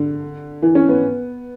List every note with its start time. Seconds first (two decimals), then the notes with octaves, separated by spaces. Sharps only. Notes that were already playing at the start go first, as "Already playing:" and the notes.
Already playing: D3
0.62 E3
0.75 C#4
0.89 B3